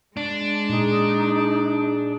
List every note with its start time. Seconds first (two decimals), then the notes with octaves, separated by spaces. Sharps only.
0.17 G#3 D4
0.69 A#2 D#4 G#4